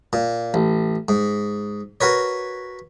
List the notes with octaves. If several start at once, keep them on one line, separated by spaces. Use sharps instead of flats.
A#2
A1
G#2
F#4 A#4 B4 C#5